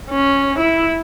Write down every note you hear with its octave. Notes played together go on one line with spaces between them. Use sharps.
C#4
E4